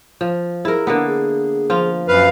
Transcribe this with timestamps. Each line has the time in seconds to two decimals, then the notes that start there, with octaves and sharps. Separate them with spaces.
0.21 F3
0.65 E4 G#4 A#4
0.87 D3 A#3 B3
1.07 G#4
1.70 F3 F4
2.08 F#2 B4 F5